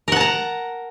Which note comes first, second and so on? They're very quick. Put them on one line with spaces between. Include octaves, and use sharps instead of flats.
A#4 F#5 A5 A#5